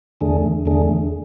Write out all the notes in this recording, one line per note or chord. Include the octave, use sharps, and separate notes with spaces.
E2 D3 A3 D4 G#4
E2 D3 A3 D4 G#4